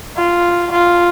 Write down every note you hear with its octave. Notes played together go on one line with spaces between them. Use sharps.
F4
F4